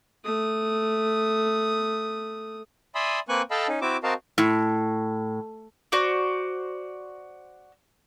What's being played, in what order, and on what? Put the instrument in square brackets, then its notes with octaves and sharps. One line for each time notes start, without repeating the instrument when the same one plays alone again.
[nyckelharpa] A3 D#6
[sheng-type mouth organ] D5 E5 G#5 B5 C6 D#6
A#3 C4 B4 G#5 C#6 F#6
A4 D#5 F5 G5 A5 B5
C#4 D#4
C4 E4 F#4 E5 D6
C4 F#4 A#4 D#5 F5 A5
[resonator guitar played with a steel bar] A2
[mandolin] F#4 C5 D5